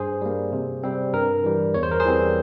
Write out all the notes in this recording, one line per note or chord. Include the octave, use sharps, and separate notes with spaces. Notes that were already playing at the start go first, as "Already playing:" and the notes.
Already playing: G2 G#4 C5
G3 A#3
C3
G3 C4
G2 A#4
E3 G3
E2 C#5
C5
A#4
G#4 C5
E3 G3 C4